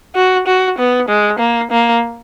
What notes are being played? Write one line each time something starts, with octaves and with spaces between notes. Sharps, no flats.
F#4
F#4
B3
G#3
A#3
A#3